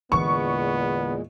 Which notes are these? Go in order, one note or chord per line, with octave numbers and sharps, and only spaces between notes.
E2 A#2 D3 E3 G#3 B3 C#6